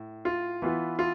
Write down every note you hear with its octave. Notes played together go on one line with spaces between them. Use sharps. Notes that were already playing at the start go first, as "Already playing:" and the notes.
Already playing: A2
F4
E3 B3 F4
F4